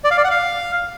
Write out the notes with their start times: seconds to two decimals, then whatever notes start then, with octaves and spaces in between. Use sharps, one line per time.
0.04 D5
0.11 F5
0.17 D5
0.24 F#5
0.31 F5